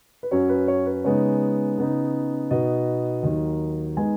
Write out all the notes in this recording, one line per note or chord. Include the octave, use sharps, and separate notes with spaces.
B4
F#2 F#3 C#4 C#5
B4
C#5
B4
C#3 G#3 B3 D#4 C#5
C#3 B3 D#4
B2 B3 D#4 D#5
D#2 D#3 F#3 D#4
G#3 B3 D#4 G#5